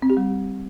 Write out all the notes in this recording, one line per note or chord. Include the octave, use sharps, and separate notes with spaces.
C4
G4
G3